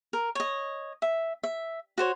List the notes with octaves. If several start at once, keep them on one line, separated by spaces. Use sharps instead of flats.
A#4
C#5 D#5
E5
E5
F#4 C5 C#5